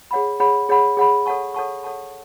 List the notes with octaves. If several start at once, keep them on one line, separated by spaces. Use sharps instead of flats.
G#4 C#5 F#5 B5
G#4 C#5 F#5 B5
G#4 C#5 F#5 B5
G#4 C#5 F#5 B5
A4 C#5 F#5 A5 C#6
A4 C#5 F#5 A5 C#6
A4 C#5 F#5 A5 C#6